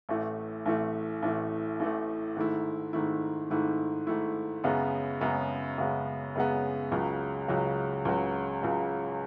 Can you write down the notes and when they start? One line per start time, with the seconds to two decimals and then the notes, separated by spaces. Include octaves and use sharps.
0.09 A1 A2 E3 A3
0.66 A1 A2 E3 A3
1.22 A1 A2 E3 A3
1.80 A1 A2 E3 A3
2.37 G#2 D#3 A3 E4
2.93 G#2 D#3 A3 E4
3.50 G#2 D#3 A3 E4
4.07 G#2 D#3 A3 E4
4.64 F#2 C#3 G#3 B3
5.21 F#2 C#3 G#3 B3
5.78 F#2 C#3 G#3 B3
6.35 F#2 C#3 G#3 B3
6.92 C#2 C#3 F#3
7.48 C#2 C#3 F#3
8.05 C#2 C#3 F#3
8.63 C#2 C#3 F#3